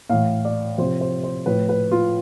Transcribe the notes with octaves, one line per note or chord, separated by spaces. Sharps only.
A2 E3 F5
D5
C3 F3 C5
C5
C5
A2 F3 B4
B4
F4